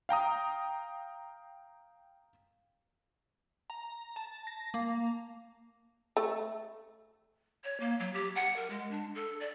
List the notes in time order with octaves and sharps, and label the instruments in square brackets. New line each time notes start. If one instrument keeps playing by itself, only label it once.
[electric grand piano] F5 G5 A#5 D#6
[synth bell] A#5
A5
A#6
A#3
[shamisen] A3
[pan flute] C#5
A#3
F#3
G4
F#5
A#4
G#3
D4
A4
D5